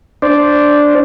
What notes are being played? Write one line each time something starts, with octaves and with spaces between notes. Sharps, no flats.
D4 C5 D5